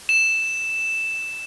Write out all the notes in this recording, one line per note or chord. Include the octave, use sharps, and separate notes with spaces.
E7